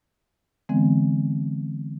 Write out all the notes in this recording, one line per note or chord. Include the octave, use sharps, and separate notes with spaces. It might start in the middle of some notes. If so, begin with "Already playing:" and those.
D3 E3 G#3 B3 C4